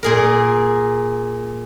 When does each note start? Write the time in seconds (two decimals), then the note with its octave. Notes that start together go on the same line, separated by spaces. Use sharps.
0.03 A#2 G#4 A#4